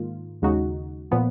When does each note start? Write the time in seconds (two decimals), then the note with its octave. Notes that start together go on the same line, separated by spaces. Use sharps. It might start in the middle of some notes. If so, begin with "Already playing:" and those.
Already playing: G#2 D#3 A#3 F4
0.42 D#2 C#3 G#3 D#4 F#4
1.11 A#2 F3 B3